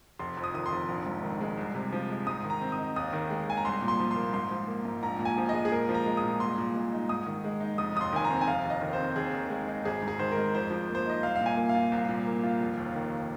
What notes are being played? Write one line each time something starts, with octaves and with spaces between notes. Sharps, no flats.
F1 C6
F2
D#6
D#3 D#6
C6
F1
A#1
G#2
D#3
G#3
C2
C3
F3
G#3
G#2 D#6
D#3
A#5
C4
D#6
D#4
D#2 D#6
D#3
G#3
D#2 G#5
A#5
C2 C6
A#2
C6
F3
C6
A#3
G#2 C6
F3
A#3
G#2
A#1 A#5
A#2
G#5
F3
G#3 D#5
G#4
A#2 A#4
F3
A#5
G#3
D#6
A#2
C2 C6
A#2
G#3
D#4
G#2 D#6
D#3
G#3
D#4
F1 D#6
D#2 D#6
C6
D#3 G#5
A#5
C4
G#5
F1 F5
D#2
D#5
D#3
C5
C4
D#2 G#4
D#3
G#3
D#4
G#1 G#4
G#2
G#4
D#3 C5
A#4
G#3
F2 C5
F3
A#3
C5
D#4 D#5
C2 F5
A#2 F5
G#5
A#3
F5
F4
C2
A#2
A#3
F4
F1
D#2
D#3